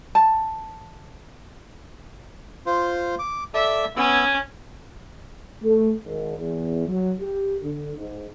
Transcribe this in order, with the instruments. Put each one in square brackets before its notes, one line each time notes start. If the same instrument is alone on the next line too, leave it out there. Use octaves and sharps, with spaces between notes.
[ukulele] A5
[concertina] F4 C5
D6
[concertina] A4 D5 A5 [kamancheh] E5
[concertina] B3 E6 [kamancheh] C#4
[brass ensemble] A3
G#1
E2
F#3
G4
D3
G#2